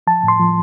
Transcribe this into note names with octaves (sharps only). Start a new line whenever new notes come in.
F3 A5
A2
C6
F3